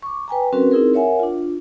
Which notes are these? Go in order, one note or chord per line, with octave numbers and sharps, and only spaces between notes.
C#6 D6
B4 G5 G#5 A#5
F#3 C4 C#4 F#4 A#4 B4
C4 D#4 E4 G#4 A#4
A#4 C#5 E5 F#5 G#5
D4 F4